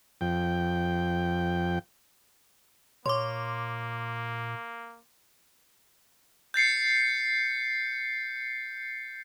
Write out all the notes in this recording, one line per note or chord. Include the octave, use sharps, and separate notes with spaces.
F2 G5
A#2 A#3 C#5 C6 D6
G6 A6 C7 C#7